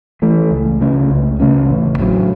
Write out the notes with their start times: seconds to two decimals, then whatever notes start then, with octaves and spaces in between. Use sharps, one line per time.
0.22 E3 A3
0.51 C#2
0.81 C#3 A3 C#4
1.10 C#2
1.40 C#3 A3 C#4
1.69 A1
1.99 A2 F#3